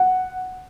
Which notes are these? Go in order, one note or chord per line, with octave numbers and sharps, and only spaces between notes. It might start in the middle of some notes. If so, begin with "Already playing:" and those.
Already playing: F#5